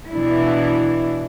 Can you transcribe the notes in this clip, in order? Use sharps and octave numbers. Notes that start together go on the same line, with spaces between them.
B2 E3 D4 E4